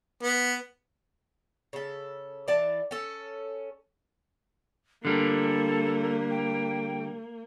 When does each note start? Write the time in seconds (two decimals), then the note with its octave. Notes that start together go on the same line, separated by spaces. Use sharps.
0.23 B3
1.73 C#3 A4
2.48 E3 D5 A5
2.91 C#4 A4
5.05 D3 G3 A#3 A4
6.30 G5